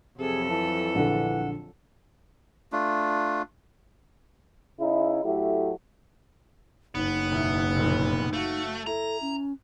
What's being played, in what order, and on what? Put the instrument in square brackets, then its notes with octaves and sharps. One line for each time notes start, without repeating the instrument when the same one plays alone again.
[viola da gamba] F2 F#3 A4 [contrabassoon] C3 [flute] G#4
[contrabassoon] E3 [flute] A5
[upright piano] A#1 D3 [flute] F#5
[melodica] A3 D4 F4
[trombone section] C#3 D#4 E4
A2 F#3 A3 E4 G4
[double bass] F#1 [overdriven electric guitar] B3 [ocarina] D#4
[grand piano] E1 E4
F1 A#1 A#2
[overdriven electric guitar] A3 [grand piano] F#4 F5
[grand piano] E4 [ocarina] A4 [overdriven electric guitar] A#5
[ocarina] C#4